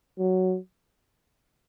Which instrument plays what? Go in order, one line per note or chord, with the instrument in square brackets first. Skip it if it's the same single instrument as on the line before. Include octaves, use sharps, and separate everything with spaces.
[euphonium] F#3